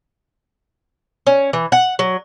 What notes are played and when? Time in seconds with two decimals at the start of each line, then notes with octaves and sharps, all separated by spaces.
1.27 C#4
1.53 E3
1.72 F#5
1.99 F#3